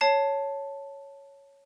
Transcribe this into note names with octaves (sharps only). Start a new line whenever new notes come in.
C#5 A5 C7